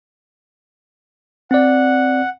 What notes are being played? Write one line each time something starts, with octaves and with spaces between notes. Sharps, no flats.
C4 D5 F#5